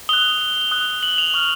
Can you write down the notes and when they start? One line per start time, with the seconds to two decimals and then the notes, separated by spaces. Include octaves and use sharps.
0.09 D#6 F#6 G7
0.71 D#6 F#6
1.03 F#7
1.18 F7
1.34 C#6 F6